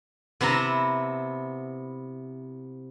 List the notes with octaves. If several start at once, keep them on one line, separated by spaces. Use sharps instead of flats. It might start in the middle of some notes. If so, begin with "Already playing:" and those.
C3 B3 E4 A5 A#5